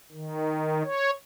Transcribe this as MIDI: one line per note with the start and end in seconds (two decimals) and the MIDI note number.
0.12 0.83 51
0.84 1.11 73